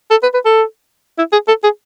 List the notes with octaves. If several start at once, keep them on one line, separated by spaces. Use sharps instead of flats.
A4
B4
B4
A4
E4
G#4
A4
G#4